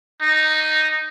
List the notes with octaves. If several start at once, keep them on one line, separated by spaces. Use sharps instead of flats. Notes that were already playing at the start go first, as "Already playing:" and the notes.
D#4